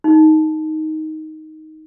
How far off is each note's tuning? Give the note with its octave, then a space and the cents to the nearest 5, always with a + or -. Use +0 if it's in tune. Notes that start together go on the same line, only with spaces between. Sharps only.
D#4 +10